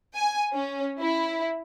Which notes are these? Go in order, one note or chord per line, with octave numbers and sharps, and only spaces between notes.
G#5
C#4
E4